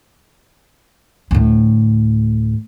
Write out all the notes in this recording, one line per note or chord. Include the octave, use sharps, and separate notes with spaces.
D2 A2